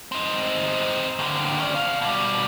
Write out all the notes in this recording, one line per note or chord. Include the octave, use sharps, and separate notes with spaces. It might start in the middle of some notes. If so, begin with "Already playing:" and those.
C4 D#4
D#2 D3
C#4 D5
B2 F5
B2 G3